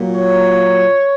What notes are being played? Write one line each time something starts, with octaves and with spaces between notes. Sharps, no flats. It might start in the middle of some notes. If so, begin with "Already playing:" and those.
Already playing: A#2 F#3 A#3
C#5